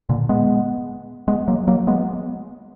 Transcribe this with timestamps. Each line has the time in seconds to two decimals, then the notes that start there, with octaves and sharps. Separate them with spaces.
0.09 A#2 D3
0.29 G#3 B3
1.28 G#3 B3
1.48 F#3 A#3
1.68 F#3 A#3
1.87 G#3 B3